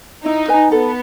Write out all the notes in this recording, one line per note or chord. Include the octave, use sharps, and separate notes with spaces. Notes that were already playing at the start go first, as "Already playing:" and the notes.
D#4 E4
B4 D#5 G#5
B3 A4